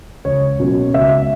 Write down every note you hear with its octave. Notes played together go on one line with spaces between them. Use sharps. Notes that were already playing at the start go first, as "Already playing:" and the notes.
C#2 C#5
B2 F#3 A#3 C#4
C#2 E5